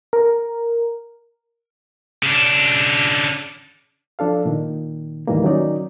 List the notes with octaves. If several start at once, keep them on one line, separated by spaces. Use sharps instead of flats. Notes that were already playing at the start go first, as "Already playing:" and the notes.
A#4
C#3 D4
F3 D4 A4 F5
A#2 D#3
E2 A2 D#3 E3 G3 A#3
D#3 F#3 C#4 D#4 D5